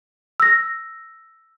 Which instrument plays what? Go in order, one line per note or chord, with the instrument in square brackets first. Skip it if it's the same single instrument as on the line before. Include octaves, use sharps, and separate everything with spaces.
[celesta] E6 A#6